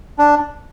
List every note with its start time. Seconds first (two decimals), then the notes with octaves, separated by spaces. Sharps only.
0.18 D4